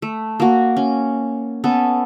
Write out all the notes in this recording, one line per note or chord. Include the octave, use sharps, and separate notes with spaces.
A3
A#3 F#4
C#4
B3 C#4 A4